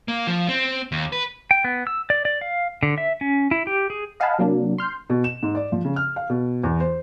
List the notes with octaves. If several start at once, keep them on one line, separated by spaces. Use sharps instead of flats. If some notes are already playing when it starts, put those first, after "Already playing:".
A#3
F3
C4
D#2
B4
G5
B3
E6
D5
D5
F5
D3
E5
C#4
E4
G4
G#4
D#5 F5 F#5 G#5 A5 B5
C3 F#3 A#3 D4
C6 F6 G6
B2
E7
G#2
D5
F3
C#3
F6
F5
B2
E2
C5